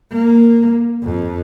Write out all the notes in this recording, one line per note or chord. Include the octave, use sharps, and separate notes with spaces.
A#3
F2